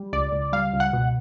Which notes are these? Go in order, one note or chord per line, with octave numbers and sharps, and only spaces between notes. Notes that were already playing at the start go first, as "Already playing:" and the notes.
Already playing: G3
C#2 D5
C#2
G3 F5
C#2
F#5
B2